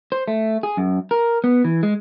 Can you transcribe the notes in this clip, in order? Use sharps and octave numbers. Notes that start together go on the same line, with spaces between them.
C5
A3
G#4
F#2
A#4
B3
E3
G#3